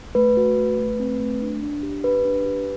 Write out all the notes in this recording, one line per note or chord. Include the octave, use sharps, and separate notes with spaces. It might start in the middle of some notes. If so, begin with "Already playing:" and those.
A3 B4
F#4
A3
A3
C4
A3
D4
D4
G4
G4 B4
D4
G4